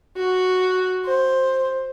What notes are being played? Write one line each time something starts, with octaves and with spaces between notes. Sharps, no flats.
F#4
C5